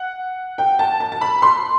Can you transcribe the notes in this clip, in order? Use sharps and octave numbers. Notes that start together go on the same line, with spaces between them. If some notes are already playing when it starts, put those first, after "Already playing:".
Already playing: F#5
G5
A5
A5
A5
B5
C6